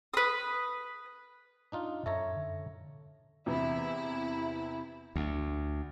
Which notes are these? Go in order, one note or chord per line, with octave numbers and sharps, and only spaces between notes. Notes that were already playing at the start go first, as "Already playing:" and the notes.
B4 D#6
D4 D#4 F4
F#2 A4 C#5 E5 A#5
D3
E2 C3 E3 E4
D2